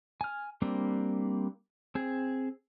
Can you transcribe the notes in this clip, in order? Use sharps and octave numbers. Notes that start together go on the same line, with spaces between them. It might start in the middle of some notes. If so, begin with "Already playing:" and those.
G#5 F6
G3 A#3 C4 D4
C4 G#4